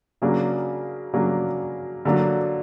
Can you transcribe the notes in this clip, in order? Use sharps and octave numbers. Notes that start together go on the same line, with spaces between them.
C#3 F#3 A#3 D4
C#3 F#3 A#3 D4
D3 F#3 A#3 D4